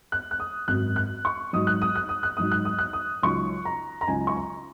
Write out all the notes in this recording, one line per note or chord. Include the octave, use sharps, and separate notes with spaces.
F#6
F#6
D#6
G#1 F#2 F#3 F#6
F#6
C#6
G#2 F#3 D#4 D#6
F#6
D#6
F#6
D#6
F#6
G#2 F#3 D#4 D#6
F#6
D#6
F#6
D#6
C#2 C#3 F#3 D#4 C#6
A#5
A#5
C#2 C#3 F#3 D#4 G#5
C#6
A#5